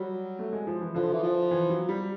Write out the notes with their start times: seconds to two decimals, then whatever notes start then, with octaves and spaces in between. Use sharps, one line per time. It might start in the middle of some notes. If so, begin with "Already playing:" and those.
Already playing: F#3 G3
0.39 A3
0.53 G#3
0.67 F3
0.81 E3
0.95 D3 F3
1.13 E3
1.23 F3
1.51 E3
1.70 F#3
1.89 G3